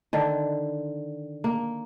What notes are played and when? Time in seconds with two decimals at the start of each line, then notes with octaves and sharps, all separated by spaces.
0.13 D3 D#3
1.44 A#3